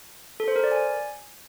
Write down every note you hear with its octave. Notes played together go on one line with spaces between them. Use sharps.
A4
C5
A#4
D5
G#5